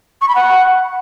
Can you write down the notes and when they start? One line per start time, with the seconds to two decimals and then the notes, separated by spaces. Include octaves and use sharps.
0.21 C#6
0.28 B5
0.35 F#5